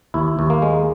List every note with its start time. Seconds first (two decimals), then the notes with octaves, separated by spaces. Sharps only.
0.14 D#2 E4
0.39 D#2
0.50 A#3
0.62 G#3